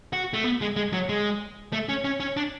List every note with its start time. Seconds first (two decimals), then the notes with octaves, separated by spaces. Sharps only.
0.13 F#4
0.33 A3
0.44 B3
0.61 G#3
0.76 G#3
0.93 F#3
1.09 G#3
1.73 A3
1.89 C#4
2.04 C#4
2.20 C#4
2.37 D4